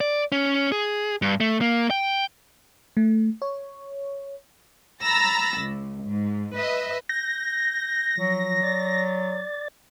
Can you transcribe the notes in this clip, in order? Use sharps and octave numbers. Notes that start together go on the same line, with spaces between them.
D5
C#4
G#4
G2
A3
A#3
G5
A3
C#5
A#5 B5 E6 A6 A#6
C#2
G#2
B4 D#5 E5
G6 A#6
F3 F#3
D5 A6